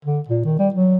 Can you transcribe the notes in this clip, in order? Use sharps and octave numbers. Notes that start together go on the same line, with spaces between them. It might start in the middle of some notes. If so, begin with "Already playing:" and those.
D3
A#2
D#3
G3
F#3